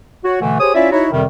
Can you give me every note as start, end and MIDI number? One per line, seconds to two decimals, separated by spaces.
0.24 0.40 66
0.24 0.40 73
0.41 0.58 47
0.41 0.58 50
0.41 0.58 52
0.41 0.58 57
0.60 0.73 67
0.60 0.73 68
0.60 0.73 72
0.60 0.73 73
0.60 0.73 87
0.75 0.90 61
0.75 0.90 64
0.75 0.90 65
0.75 0.90 73
0.75 0.90 74
0.75 0.90 76
0.92 1.08 63
0.92 1.08 64
0.92 1.08 66
0.92 1.08 73
1.12 1.25 41
1.12 1.25 48
1.12 1.25 51
1.12 1.25 55